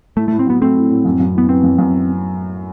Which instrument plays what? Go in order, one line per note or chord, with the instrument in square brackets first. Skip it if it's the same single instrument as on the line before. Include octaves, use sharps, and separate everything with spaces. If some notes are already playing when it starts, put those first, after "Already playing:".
[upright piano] A2 [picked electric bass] A3
[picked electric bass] A3
[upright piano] A2
[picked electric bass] C4
[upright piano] F#3 [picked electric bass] B3
[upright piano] A3 [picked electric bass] C4
[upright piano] A2
A2
F#2
F#2
[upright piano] E3 [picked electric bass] B3
[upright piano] B3 [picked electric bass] C4
[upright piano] F#2
F#2